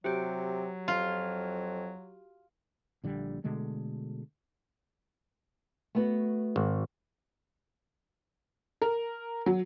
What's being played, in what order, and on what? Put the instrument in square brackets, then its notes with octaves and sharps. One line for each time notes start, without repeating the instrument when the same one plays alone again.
[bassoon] C3 [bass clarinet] F#3 [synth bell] F#4 G4
[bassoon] F2 [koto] F4
[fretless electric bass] A#1 D3 G3 D4
B2 D3 G#3 A3
[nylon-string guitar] A3 B3 F#4
[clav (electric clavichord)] G#1
[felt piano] A#4
F#3